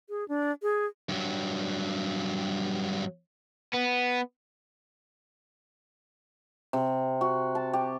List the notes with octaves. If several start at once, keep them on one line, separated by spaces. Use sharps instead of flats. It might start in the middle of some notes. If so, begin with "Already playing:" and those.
G#4
D4
G#4
G2 F#3
B3
C3
F#4
A5
G4